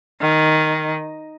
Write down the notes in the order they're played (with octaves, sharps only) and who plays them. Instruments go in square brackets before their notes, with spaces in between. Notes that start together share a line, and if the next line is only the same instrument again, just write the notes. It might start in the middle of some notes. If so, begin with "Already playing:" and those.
[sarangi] D#3